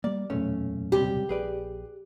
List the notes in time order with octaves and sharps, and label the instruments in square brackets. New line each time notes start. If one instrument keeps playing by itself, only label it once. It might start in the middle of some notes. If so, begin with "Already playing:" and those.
[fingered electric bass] G3 A#3 [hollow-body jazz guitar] D5
[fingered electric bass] D1 E2 A#2 [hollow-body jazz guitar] B1 A3 C#4
[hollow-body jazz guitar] C#2 C3 G3 [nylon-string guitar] G4
[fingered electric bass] A#1 [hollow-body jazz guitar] G#4 B4 D5